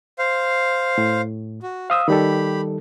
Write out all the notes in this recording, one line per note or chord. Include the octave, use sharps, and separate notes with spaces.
C5 F5
A2
F#4
C5 F5 D#6 E6
D#3 G3 G4 A4 B5